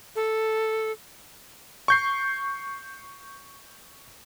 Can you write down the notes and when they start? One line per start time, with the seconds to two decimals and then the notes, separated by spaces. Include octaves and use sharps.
0.16 A4
1.88 C#6 G6 C7